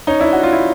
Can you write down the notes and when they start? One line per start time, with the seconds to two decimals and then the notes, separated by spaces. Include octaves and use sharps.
0.07 C#4 D#4
0.20 D4 E4
0.33 F#4
0.43 F4
0.53 E4